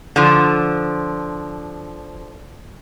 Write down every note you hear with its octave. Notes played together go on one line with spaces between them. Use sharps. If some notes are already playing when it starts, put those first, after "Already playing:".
D3 F3